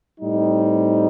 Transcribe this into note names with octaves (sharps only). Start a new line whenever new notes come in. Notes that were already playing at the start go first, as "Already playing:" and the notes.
A2 G3 C4 D#4